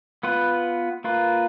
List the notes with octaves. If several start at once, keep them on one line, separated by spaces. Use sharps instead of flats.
B3 F4 B4
A#3 F4 B4